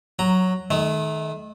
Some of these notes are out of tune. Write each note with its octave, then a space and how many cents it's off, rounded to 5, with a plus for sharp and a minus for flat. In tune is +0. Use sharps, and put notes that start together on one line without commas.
F#3 +0 A#5 +0
D#3 +0 A3 -35